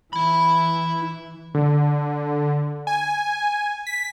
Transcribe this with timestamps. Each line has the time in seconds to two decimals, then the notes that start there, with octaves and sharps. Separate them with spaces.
0.13 E3 E4 B5
1.55 D3
2.87 G#5
3.87 B6